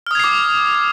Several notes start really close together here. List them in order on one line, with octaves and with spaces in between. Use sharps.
F6 D#6 G#6 C7 D6